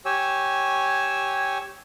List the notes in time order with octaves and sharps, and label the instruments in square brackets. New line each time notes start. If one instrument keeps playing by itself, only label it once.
[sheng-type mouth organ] G4 C#5 G#5 E6